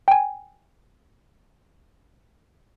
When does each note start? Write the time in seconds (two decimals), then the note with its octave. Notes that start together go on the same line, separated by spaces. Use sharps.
0.08 G5 G#5